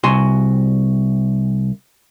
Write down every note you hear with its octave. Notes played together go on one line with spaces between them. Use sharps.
C2 F#4 G#5 C6